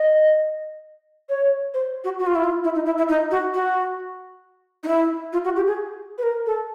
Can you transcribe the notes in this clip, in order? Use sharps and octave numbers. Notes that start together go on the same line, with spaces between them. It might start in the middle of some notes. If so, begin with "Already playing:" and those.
Already playing: D#5
C#5
C5
F#4
F#4
F4
E4
F4
E4
D#4
E4
E4
D#4
F#4
F#4
D#4
E4
F4
F#4
G4
G#4
B4
A#4
A4